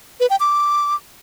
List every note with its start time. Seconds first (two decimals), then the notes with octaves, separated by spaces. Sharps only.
0.20 B4
0.30 G5
0.40 D6